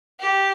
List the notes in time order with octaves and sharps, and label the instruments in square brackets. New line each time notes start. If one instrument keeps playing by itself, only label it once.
[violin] G4